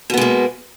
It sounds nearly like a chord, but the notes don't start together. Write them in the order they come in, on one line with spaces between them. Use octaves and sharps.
B2 B3 G#3 A#3